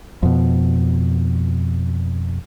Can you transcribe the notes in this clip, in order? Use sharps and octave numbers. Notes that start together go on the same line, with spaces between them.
F2 B2